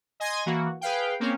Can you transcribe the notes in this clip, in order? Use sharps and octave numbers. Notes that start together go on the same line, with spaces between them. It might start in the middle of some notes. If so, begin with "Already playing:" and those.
D#5 G#5 C6 G#6 A#6
E3 A#3 F#4
G#4 B4 F5 G5
A#3 C4 C#4